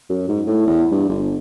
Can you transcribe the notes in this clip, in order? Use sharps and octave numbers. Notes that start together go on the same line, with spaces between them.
F#2
G#2
A2
E2
G2
G1